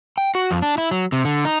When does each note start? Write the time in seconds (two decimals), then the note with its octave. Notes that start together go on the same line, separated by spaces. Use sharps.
0.18 G5
0.35 F#4
0.51 F2
0.62 D4
0.78 E4
0.91 F#3
1.12 C3
1.25 D3
1.45 D#4